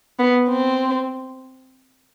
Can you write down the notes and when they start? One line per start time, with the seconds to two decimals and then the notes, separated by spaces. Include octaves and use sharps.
0.19 B3
0.49 C4